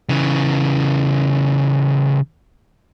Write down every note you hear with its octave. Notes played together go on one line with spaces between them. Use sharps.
C#3 E3